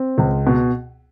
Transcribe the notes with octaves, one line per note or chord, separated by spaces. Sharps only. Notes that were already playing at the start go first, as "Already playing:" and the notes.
Already playing: C4
C#2
B2